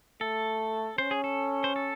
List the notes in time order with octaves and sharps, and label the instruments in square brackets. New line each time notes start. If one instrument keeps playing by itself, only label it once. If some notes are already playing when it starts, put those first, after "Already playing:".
[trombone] A3 [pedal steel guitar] A4
[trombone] C#4 [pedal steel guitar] C5
[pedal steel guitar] G#4
A4
C5
A4